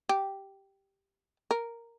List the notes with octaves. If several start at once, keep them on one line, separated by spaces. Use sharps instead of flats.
G4
A#4